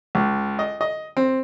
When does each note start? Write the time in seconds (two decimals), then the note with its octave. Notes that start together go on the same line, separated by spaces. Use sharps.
0.15 C#2
0.59 D#5
0.81 D#5
1.17 C4